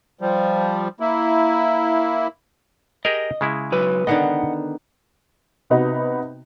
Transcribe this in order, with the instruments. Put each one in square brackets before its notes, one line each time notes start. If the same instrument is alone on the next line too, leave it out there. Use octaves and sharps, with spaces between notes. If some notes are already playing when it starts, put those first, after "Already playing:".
[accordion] F3 G3
A#3 E4
[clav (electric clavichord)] G4 G#4 A#4 [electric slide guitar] D#5
[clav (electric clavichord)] C#3 G#3 E4
[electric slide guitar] F#3 B4
[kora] D3 D#3 B3 [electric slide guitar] D#5 F#5
[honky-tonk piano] C3 B3 D#4 F#4 B4